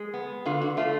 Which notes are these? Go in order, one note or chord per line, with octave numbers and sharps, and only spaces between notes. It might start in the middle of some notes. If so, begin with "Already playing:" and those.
Already playing: G#3
B3
D3 F4
F#4
A3 F4